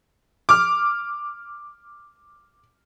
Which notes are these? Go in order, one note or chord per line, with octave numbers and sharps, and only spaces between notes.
D6 F6